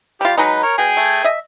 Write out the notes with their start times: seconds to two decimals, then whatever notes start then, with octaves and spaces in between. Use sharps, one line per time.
0.21 G3 F4 G4
0.37 F#3 G#3 D#4 B4
0.63 A#4 C#5
0.78 B2 G#4 G5 G#5
0.97 A3
1.25 D#5 E5